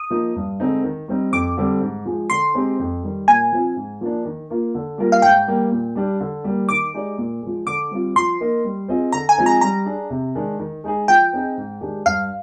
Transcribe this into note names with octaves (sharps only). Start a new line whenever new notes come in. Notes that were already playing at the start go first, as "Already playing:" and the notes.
Already playing: D#6
F3 A#3 D#4
G2
D3 G#3 C4 D#4
D#3
G3 C4 D#4
F2 D6
D3 G3 C4
G#2
F3 G#3
D3 C6
G#3 C4 D#4 G4
F2
D#3 G3
A#2 G#5
F3 C4 F4
G#2
F3 A#3 D4
D#3
A#3 F4
D3
G3 A#3 F4 A#4
F5
G#2 G5
G3 A#3
A#2
G3 D4 G4
D3
G3 A#3
D#3 D6
G#3 D#4 G4 D5
A#2
F3 G#3
D3 D6
G3 C4 F4
F3 C6
A#3 D#4 A#4 D#5
G3
C4 F4 G#4 D#5
D3 A#5
G#5
F3 G#3 C4 D#4
A#5
G3 A#5
D4 G#4
C3
D#3 G#3 D4
D#3
G#3 D#4 G#4
F3 G5
C4 D#4 G#4 D#5
G#2
D#3 G#3 D4 G4
G2 F5